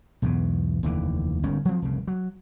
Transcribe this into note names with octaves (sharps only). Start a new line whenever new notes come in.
B1 E2 G#2 B2
F1 D#2 D3 E3
G1 G#2 D#3 C#4
F3 F#3 C4
F1 C2 C#3
F#3